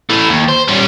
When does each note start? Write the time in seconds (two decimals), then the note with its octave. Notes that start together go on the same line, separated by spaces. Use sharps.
0.10 E3 A3
0.29 D#2
0.49 C5
0.68 G3 C#4